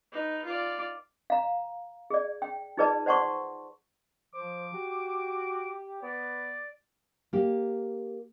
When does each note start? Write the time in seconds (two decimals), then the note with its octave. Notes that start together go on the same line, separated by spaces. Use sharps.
0.12 D#4 B4
0.45 F4 D5
1.30 F5 A#5
2.10 G#4 D5
2.42 G5
2.77 D#4 F4 G#4 B4 D5 A5
3.06 C5 D5 F#5 A5 C6 C#6
4.35 F3 C5 D6
4.74 F#4 G4
6.03 B3 B4 D5
7.33 A#3 G4